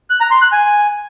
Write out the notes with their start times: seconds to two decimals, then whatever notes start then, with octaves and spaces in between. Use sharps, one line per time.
0.10 F#6
0.21 A#5
0.31 C6
0.42 F#6
0.52 G#5